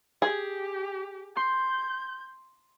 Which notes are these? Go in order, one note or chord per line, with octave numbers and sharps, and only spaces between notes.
G4 G#4
C6 G6